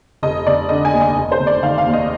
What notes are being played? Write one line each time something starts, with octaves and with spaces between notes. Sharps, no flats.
F1 D#5
F1 D5
D3 D#5
G#5
D#2
D#5
F1
C5
F1
D5
D#3 F5
F5
D#2
D#5